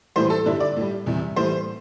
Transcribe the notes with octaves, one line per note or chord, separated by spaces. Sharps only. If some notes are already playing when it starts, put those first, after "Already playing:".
A2 E3 G3 C5
A4
G2 D3 G3 E4
D5
A2 G3
E2 C3 G3
A2 E3 G3 C5